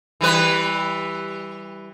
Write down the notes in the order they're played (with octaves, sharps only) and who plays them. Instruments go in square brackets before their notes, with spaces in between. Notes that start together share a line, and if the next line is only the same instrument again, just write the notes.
[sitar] E3 G3 B4